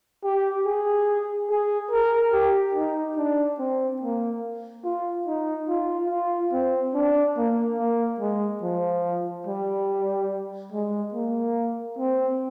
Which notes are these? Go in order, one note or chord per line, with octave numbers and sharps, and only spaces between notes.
G4
G#4
G#4
A#4
G4
D#4
D4
C4
A#3
F4
D#4
F4
F4
C4
D4
A#3
A#3
G#3
F3
G3
G#3
A#3
C4